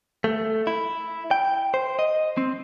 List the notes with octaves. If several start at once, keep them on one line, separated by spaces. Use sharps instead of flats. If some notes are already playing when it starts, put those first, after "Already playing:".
A3
E4
G5
C5
D#5
C4